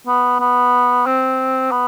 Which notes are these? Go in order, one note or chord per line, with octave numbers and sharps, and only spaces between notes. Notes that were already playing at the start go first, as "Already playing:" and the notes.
B3
B3
C4
B3